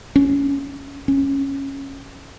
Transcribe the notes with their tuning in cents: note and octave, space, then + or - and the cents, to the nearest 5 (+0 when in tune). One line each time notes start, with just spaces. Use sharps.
C#4 +10
C#4 -10